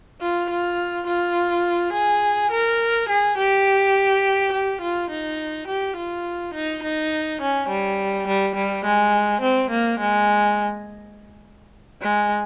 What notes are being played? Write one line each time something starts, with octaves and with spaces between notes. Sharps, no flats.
F4
F4
F4
G#4
A#4
G#4
G4
G4
F4
D#4
G4
F4
D#4
D#4
C#4
G3
G3
G3
G#3
C4
A#3
G#3
G#3